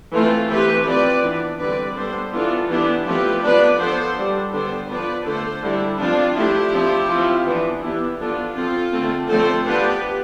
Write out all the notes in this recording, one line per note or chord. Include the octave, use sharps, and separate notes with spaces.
E3 A3 C4 F4 A4
E3 A3 C4 G4 B4
F3 C4 B4 D5
E3 B3 D4
D3 G3 C4 B4 D5
G3 B3 D4 A4 C5
E3 B3 D4 F4 A4
E3 B3 D4 E4 G4
F3 A3 C4 G4 B4
F3 B3 D4 B4 D5
F3 B3 D4 A4 C5
G3 D4
D3 G3 B3 D4 A4 C5
F3 B3 D4 B4 D5
D3 A3 D4 A4 C5
D3 G3 D4 E4
F3 C4 D4 F4
F3 A3 D4 E4 G4
F3 C4
F3 C4
E3 B3 D4
E3 B3 D4 E4 G4
F3 B3 D4 F4 A4
F3 C4 F4 A4
D3 A3 C4
D3 F3 A3 C4 A4 C5
F3 B3 D4 G4 B4